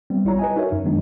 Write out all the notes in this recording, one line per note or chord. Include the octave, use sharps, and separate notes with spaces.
G3 B3 C4
A#1 G3 E4 F4 C#5 A#5
B4 D#5 G#5
D#4 F#4 A#4 C#5 E5
F#2
D#3 F#3 G#3 B3 D4 D#4